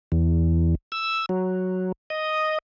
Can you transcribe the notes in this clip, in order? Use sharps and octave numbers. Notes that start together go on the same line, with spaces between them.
E2
E6
F#3
D#5